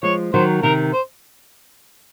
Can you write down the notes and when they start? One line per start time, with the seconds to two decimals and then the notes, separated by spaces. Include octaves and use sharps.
0.03 F3 G#3 C#5
0.34 D#3 F#3 C5
0.63 C3 D#3 A#4
0.93 C5